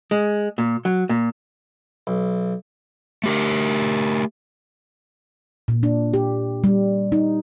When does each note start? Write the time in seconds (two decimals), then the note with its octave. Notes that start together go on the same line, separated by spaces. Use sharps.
0.11 G#3
0.58 A#2
0.85 F#3
1.09 A#2
2.07 B1
3.24 A3 G4 A#4
5.68 A#2
5.83 D4
6.14 G4
6.64 G3
7.12 D#4